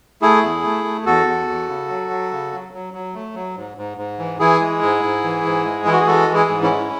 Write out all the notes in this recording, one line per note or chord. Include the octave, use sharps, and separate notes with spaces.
A3 E4 G#4
E2
A3
A3
E2 F#4 A4
E2
E2
C#3
F#3
F#3
C#3
F#3
F#3
F#3
A3
F#3
G#2
G#2
G#2
E3
E3 E4 G#4
G#3
G#2
G#2
E3
G#2
G#3
E3 E4
F#4
G#4
G#3 F#4 A4
E3
E4 G#4
G#2
C#4 E4
G#3